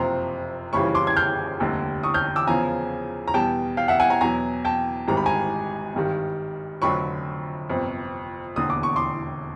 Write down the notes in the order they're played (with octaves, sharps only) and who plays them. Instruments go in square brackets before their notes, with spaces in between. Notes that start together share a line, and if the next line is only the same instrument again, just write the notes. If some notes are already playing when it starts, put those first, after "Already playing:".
Already playing: [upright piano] F#1 F2 C3 F3 A#5 C6
F#1 F2 C#3 E3 G3 B5 C#6
C6 D6
G#6
F6 G6
F1 D#2 D3 G3
C#6 D#6
F6 G6
D6 E6
E2 C#3 F3 G#5 A#5
A#5
E2 B2 G3 G5 A5
F5 G5
E5 F#5
F#5 G#5
G#5 A#5
E2 B2 F#3 G#5 A#5
G5 A5
G#1 G#2 D#3 G3 A#5
B5
G#5 A#5
G#1 G2 D#3 G3
F1 F2 D3 F#3 B5 C#6
G1 F2 C3
E1 D#2 D3 D#6
D6
C#6
C6 D6